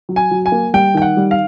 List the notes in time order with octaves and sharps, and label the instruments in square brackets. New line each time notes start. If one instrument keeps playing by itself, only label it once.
[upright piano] F#3
[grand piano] G#5
[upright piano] F#3
[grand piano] G#5
[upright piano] A#3
[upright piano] G3 [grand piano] G5
[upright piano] D#3 [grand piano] G5
[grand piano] F#5
[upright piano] G3
[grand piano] F5